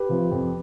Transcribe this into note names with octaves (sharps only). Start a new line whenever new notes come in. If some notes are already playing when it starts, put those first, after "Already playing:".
Already playing: G4 B4
C3 F3
F2